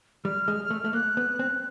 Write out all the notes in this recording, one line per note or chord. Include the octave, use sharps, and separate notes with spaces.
G3 F6
G#3
A3
A3
A#3 F#6
B3
C4